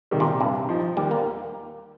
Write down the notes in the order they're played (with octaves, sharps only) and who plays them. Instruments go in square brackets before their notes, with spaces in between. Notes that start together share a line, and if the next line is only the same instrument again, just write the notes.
[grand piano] C3 D#3 G3
[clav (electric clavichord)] A#2
[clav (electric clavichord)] G2 [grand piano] C3
[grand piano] F3 D#4
[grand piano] D#2 [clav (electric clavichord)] G3
[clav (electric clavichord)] A#3